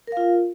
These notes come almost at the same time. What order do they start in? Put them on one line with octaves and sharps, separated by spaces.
A#4 F5 F4